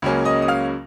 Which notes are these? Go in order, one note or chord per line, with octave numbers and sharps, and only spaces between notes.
C#2 C#3 F#3 A#3 C#4
D#5 D#6
D#6
F5 F6